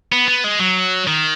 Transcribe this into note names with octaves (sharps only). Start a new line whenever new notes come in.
B3
B3
G#3
F#3
D#3